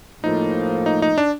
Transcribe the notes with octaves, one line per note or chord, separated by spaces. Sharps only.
A2 F3 A#3 D#4
D#4
D#4
D4